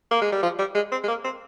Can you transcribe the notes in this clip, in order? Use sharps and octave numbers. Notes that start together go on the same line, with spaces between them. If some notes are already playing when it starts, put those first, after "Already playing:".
A#3
G#3
G3
F3
G3
G#3
C4
G#3
A#3
C4